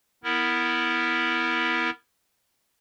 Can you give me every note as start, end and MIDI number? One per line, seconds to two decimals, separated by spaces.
0.24 1.90 59
0.24 1.90 64
0.24 1.90 70